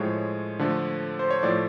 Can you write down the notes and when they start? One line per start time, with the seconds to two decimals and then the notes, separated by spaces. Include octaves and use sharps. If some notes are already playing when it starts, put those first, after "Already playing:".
Already playing: A2 F3 G#3 C#5
0.59 D3 F3 A3
1.19 C5
1.30 C#5
1.43 A2 F3 A3 D5